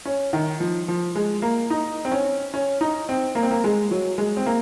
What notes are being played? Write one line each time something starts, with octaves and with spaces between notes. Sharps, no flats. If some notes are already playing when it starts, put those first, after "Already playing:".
C#4
D#3
F3
F3
G#3
A#3
D#4
C4
C#4
C#4
D#4
C4
A#3
C4
A#3
G#3
F#3
G#3
C4
A#3